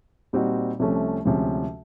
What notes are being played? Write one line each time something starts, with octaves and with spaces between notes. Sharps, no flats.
A#2 G3 C4 D#4 F#4
C2 C3 F3 A3 C#4
D2 C3 F3 G#3 C#4